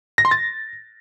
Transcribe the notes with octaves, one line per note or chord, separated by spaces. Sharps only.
A#6
C6
A6